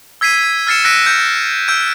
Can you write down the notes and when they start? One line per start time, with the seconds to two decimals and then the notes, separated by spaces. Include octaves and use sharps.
0.21 E6 G#6 B6 C7 D#7
0.67 E6 F6 A6 C7 C#7 E7
0.84 E6 F#6 A#6 B6 D7 D#7
1.06 G6 C#7
1.68 E6 G6 D7